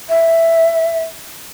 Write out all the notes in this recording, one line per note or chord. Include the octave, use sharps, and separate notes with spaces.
E5